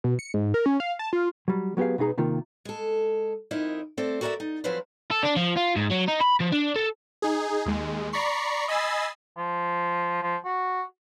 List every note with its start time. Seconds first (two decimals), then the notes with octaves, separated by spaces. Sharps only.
0.04 B2
0.19 C#7
0.34 G#2
0.54 A#4
0.66 C#4
0.80 F5
0.99 A5
1.13 F4
1.48 F#3 G3
1.77 F#3 B3 G4 G#4 F5
1.98 B2 B3 D#4 G#4 A#5
2.18 C3 D#3 A#3 F4
2.65 G#3 A4
3.51 F2 D#4 E4 A#4 D#5
3.97 A3 C4 A4 C5 D5
4.21 F#4 A4 A#4 C5 D5 E5
4.40 D#4
4.64 F3 F#3 C4 C#4 B4 C5
5.11 A4
5.23 D4
5.36 F3
5.56 F4
5.76 G#2
5.91 F#3
6.08 D#4
6.20 B5
6.40 F3
6.52 D4
6.76 A4
7.22 D#4 G#4
7.66 D#2 G#3
8.13 D5 A#5 B5 C#6 C7
8.68 D#5 G#5 B5 E6 A6 C7
9.37 F3
10.22 F3
10.45 F#4